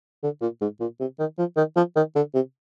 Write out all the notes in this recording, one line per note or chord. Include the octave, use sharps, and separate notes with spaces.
D3
A#2
G#2
A#2
C3
D#3
F3
D#3
F3
D#3
D3
C3